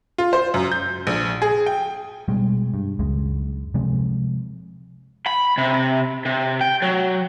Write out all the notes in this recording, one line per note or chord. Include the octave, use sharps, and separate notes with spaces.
F4
C5
F#2
G6
A#1
G#4
G5
B2 G3 G#3
G2
C#2 F#2 G#3
C3 F3 G#3 C4
B5
C3
C3
G5
F#3